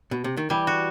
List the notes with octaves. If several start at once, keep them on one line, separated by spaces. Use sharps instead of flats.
B2
C3
D#3
E3 G3
F#4